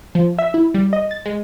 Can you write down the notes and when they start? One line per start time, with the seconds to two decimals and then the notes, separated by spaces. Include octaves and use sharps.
0.15 F3
0.39 E5
0.54 E4
0.74 G3
0.93 D#5
1.11 A6
1.26 G#3